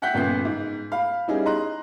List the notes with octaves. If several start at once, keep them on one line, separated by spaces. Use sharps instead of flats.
E5 F#5 G5 F#6 G6 B6
G1 A#2 C#3 B3 G6 C7
G#2
F5 B5
G3 B3 C#4 D#4 E4 G#4
D#5 A#5 C6 F#6